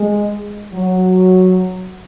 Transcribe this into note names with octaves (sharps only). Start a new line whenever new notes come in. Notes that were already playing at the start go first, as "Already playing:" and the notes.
Already playing: G#3
F#3